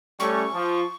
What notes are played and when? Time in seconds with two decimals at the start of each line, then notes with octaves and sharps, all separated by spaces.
0.20 G3 A3 C#4 C#6
0.53 F3